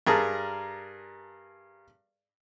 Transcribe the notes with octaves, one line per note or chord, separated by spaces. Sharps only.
G2 G#4 A#4 A5